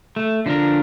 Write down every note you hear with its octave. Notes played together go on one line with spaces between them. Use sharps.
A3
D3 F3 D4 A#4